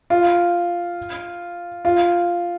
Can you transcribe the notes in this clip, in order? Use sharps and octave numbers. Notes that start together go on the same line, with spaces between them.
F4
F4